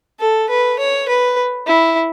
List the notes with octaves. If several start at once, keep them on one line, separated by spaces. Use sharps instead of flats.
A4
B4
C#5
B4
E4